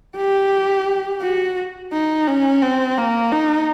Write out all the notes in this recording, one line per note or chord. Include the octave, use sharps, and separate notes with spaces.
G4
F#4
D#4
C#4
C4
A#3
D#4